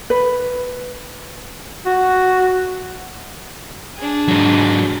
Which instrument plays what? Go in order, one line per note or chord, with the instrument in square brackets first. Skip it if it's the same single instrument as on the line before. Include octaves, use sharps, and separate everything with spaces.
[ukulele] B4
[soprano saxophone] F#4
[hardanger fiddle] D4 G#4
[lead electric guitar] G#2 F#3